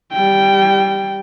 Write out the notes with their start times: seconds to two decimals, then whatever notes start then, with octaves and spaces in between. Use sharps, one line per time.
0.13 G3 G5